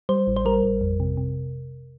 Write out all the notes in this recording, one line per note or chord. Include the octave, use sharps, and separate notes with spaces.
G3 C5
A1
C5
G3 A#4
A1
F2
C3
C3